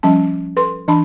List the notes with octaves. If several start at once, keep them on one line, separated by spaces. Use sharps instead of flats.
F3 G3 C#4 A5
A4 B4 C6
E3 D4 A5 B5